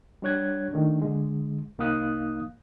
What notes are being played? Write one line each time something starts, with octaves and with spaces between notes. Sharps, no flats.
G3 D4 C#5 F#6 G#6
D#3 A3 D4
D3 G#3
C2 A#3 D#4 F5 D#6 F#6